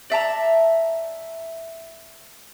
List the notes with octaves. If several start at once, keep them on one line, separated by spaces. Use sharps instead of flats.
D5 E5 A5 A#5